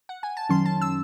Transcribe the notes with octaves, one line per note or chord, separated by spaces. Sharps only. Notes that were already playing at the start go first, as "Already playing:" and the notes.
F#5
G#5
A5
F#2 D#3 F#3 C#4 C6
A5
E6